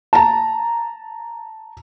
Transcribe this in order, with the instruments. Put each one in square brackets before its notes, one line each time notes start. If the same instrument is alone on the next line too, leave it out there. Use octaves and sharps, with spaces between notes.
[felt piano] A5 A#5